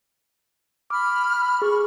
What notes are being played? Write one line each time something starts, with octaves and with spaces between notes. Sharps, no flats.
B5 D6 F6
G#4 C#6